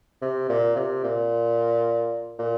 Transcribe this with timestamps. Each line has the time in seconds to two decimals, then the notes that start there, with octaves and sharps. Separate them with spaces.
0.22 C3
0.49 A#2
0.76 C3
1.04 A#2
2.39 A#2